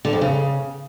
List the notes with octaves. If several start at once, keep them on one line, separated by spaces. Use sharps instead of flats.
D3
F2
C#3